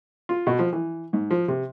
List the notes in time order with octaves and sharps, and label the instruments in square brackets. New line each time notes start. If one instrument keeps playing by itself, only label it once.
[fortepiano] F4
B2
F3
E3
G#2
F3
C3